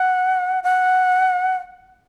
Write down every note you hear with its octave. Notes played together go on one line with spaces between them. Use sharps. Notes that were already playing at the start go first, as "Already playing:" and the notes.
Already playing: F#5
F#5